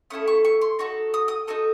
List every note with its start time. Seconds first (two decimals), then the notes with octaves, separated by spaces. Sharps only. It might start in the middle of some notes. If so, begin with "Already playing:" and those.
0.10 A3 C#4 E4 A4 D#6
0.28 C#6
0.45 C#6
0.61 C6
0.79 D#4 F#4 A4 C#6
1.14 D#6
1.28 D#6
1.47 D#4 F#4 A4 D#6